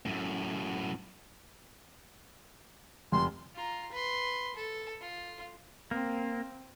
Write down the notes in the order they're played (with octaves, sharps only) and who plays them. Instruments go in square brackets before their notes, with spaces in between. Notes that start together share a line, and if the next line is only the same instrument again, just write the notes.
[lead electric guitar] F#2 A2
[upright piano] F1 [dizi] C6
[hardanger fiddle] F4 A#5
B4 C6
A4
F4
[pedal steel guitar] A#3 [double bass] C4